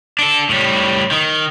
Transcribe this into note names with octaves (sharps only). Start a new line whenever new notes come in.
D4 A4
A2 G3
D#3